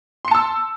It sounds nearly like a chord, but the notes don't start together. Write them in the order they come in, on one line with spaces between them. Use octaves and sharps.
C6 C#7 A5 E6